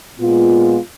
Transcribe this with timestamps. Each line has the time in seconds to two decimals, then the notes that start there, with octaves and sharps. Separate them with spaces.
0.19 A#2 G#3 B3 F4